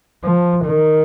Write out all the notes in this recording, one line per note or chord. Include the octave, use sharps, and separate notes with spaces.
F3
D#3